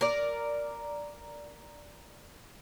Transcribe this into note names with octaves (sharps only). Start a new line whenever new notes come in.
A#4 D5